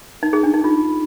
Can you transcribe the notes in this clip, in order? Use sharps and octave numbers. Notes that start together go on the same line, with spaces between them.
D#4
G#4
D4
D#4
F4